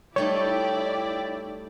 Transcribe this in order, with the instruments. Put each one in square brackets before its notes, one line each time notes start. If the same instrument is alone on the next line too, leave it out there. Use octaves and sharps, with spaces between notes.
[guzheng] G3 A3 D#4 [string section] E4 D5 G5 [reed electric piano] C#5